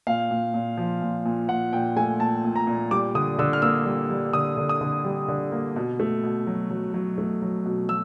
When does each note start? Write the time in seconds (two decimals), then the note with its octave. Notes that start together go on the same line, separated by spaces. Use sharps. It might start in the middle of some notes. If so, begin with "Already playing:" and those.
0.07 A#2 F5
0.31 A#2
0.54 A#2
0.78 F3
1.02 A#2
1.25 A#2
1.49 A#2 F#5
1.73 A#2 G5
1.96 A3 G#5
2.20 A#2 A5
2.44 A#2
2.56 A#5
2.67 A#2
2.91 G3 D6
3.15 D3 D#6
3.39 D3 E6
3.53 F6
3.62 A#3 E6
3.86 G3
4.10 G3
4.33 D3 D#6
4.57 D3
4.69 D#6
4.81 D3
5.05 G3
5.28 D3
5.52 A#3
5.76 B2
6.00 A3
6.23 B2
6.47 F#3
6.71 F#3
6.94 F#3
7.18 A3
7.42 F#3
7.65 B2
7.89 F#3 E6